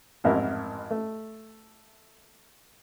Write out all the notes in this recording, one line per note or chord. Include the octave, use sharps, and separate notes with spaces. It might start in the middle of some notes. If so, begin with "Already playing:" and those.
A1 F2 G#2 E4 A#4
A3